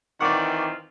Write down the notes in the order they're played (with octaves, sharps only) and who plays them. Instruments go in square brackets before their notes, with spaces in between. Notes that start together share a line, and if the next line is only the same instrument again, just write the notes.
[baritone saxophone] D#3 [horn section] E3 C4 F4 [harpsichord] D5 F#5 [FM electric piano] C#6 D6